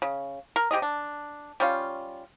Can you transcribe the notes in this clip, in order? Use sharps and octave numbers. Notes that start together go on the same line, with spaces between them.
C#3
A#4
C3 G4 G#4 D#5
D4
G3 C#4 F4